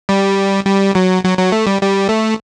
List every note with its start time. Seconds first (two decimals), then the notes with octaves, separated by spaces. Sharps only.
0.09 G3
0.66 G3
0.95 F#3
1.24 F#3
1.38 F#3
1.52 A3
1.67 G3
1.81 G3
2.09 A3